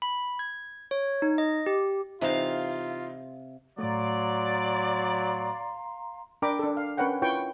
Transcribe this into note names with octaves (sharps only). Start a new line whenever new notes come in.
B5
G#6
C#5
D#4
D#5
G4
C3 E3 C4 D#4 F4 F5
A2 F#3 A3 D5 F5 A#5 C6
D4 A#4 G5 A#5 B5 D6
D4 A4
F5
C#4 A#4 B4 C#5 F#5 G5
E4 F4 B4 C#5 G5 C#6